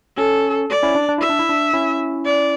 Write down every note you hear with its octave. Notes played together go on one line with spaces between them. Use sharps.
C#4 A4
D5
C#4 E4
D4
D4
E4 E5
D4
E4
D4
C#4 E4
D5